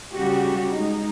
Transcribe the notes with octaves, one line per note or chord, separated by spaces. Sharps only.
C#3 G3 F#4 G4
G#3 D#4